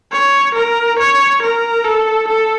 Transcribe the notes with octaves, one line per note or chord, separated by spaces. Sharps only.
C#5
A#4
C#5
A#4
A4
A4